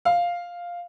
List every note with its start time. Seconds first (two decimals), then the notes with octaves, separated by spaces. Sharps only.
0.05 F5